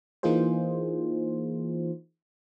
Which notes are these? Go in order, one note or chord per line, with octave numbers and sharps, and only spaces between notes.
E3 A#3 D#4 F4 G#4 C5